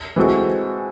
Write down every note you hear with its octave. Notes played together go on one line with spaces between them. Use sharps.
E3 G#3 C4 F#4 A4